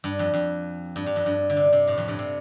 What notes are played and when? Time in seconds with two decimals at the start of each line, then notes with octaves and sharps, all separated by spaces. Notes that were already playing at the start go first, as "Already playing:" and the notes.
0.04 G2
0.19 F2
0.34 F2
0.96 G2
1.06 G2
1.16 F2
1.26 G2
1.50 D3
1.57 C3
1.73 C3
1.88 A2
1.98 F2
2.08 G2
2.19 C3